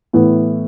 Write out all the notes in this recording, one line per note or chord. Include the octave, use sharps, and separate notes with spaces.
A2 E3 B3 E4